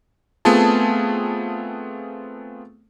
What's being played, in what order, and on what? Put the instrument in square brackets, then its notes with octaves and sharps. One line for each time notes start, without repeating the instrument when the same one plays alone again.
[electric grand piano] A3 B3 C4 F4 G#4 A5